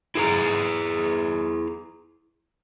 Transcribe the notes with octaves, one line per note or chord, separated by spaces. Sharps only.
E4 G#4 A#5